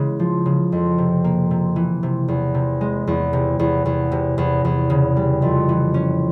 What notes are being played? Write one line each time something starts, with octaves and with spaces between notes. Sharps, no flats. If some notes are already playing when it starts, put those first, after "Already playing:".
Already playing: C#3 E3 G#3
F3
C#3
F2
C3
A#3
C3
E3
C3
E2
C3
G#3
E2
C3
E2
E2
C3
E2
E2
C#3
G3
F2
E3
C#4